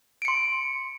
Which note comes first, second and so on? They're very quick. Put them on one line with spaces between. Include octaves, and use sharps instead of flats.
D7 C#7 C6